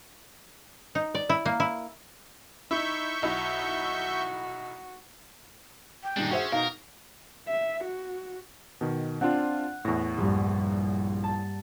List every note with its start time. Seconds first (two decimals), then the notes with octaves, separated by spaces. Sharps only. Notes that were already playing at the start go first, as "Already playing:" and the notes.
0.95 D#4
1.15 D5
1.29 E4
1.46 A#3
1.60 E4
2.71 D#4 E4 E5 C#6 G6
3.22 B1 D#4 E4 F#4
6.04 G5
6.17 G2 A#2 D#3 D4 D#4
6.31 C#4 F#4 G#4 C5 E5 F#5
6.52 B2 D#4 A#4 F5
7.48 E5
7.84 F#4
8.81 B2 D#3
9.21 C4 D4 F4 F#5
9.85 E2 A2 C#6 A#6
10.17 A#1 G2
11.24 A5